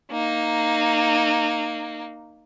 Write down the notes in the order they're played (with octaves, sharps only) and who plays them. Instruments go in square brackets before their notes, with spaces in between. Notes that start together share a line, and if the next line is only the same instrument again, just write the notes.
[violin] A#3 D#4